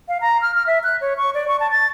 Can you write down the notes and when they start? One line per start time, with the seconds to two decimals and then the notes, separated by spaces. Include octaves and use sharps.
0.08 F5
0.21 A#5
0.42 F6
0.55 F6
0.67 E5
0.84 F#6
1.01 C#5
1.17 C#6
1.34 D5
1.48 C#6
1.60 A5
1.71 A6